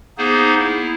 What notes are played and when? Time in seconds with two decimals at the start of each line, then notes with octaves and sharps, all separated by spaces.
0.18 A#3 B3 D#4 G#4 C5
0.59 E4